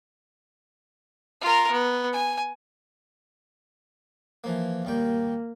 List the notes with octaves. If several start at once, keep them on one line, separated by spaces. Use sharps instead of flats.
F4 A#4
B3
G#5
E3 F3 A#3
D#2 G3 A#3 G5